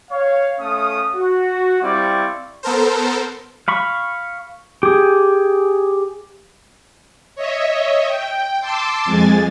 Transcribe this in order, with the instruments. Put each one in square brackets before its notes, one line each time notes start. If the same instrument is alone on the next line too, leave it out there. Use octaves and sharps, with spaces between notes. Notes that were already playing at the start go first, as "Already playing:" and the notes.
[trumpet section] C#5 F5
A3 C#4 F5 D#6
F#4
G3 C4 E4 D5 F5 C#6
[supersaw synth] B3 A4 A#4 C5
[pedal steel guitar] F5 B5 C#6
G4 G#4
[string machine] C#5 D#5 E5
G5
A5 C6 D6 E6
F2 G#3 G#5 A6